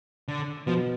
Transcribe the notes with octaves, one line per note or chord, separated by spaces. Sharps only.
D3
B2 F3